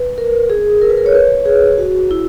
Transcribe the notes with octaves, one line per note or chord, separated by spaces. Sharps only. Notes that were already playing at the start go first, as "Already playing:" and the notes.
Already playing: B4
A#4
G#4
A#4
B4
A#4
C#5
B4
G#4
F#4
E4